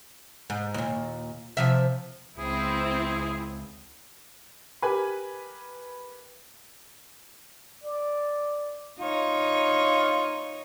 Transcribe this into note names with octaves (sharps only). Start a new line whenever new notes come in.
G#2
D#2 A#2
C3 F3 E5
C#2 C4 E4 G#4
G4 A#4 B4 G#5 B5
D5
D#4 F4 C#5